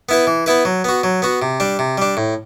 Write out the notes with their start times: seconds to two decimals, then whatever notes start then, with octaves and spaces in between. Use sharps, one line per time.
0.09 B3 E4 B4
0.27 E3
0.46 B3 E4 B4
0.65 F#3
0.84 B3 F#4
1.04 F#3
1.22 B3 F#4
1.42 C3
1.60 G3 D4
1.79 C3
1.98 G3 D4
2.17 A2